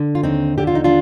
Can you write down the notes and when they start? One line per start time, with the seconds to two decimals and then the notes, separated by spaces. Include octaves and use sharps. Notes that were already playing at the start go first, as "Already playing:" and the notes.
Already playing: D3
0.15 F4
0.23 D#2 C4 D#4
0.58 D3 G4
0.67 F4
0.75 D#4
0.84 D4 F4